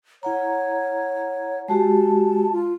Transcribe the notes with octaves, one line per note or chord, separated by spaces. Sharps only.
E4 C#5 F#5 A#5
G#3 F#4 G4 A5
F4